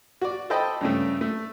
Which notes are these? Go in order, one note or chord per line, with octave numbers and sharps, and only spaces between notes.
F#4 D5
A4 C5 D#5 G5 B5
G2 C#3 A3
A3